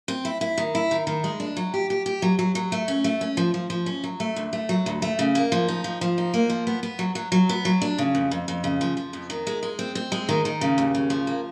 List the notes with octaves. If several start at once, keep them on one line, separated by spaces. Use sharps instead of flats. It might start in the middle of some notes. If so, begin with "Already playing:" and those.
C4
E4
E4
D#3
E4
D#3
D#3
G#3
D4
F#3
G4
G4
G4
F#3
F#3
F#3
A3
C#4
A3
C#4
F3
F3
F3
C#4
F#3
A3
D2
A3
F#3
D2
A3
C#3
A#3
F3
D#4
F3
F3
D#4
A#3
F3
B3
B3
F#3
F#3
F#3
B3
F#3
D4
C#3
F2
F2
F2
C#3
F3
F3
F2
D#3
G#3
G#3
C4
C4
G#3
D#3
D#3
C#3
D#2
C#3
F3
A#3